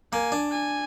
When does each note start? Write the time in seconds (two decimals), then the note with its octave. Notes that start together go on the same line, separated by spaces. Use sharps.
0.12 A#3 G#5
0.32 D4
0.52 G#5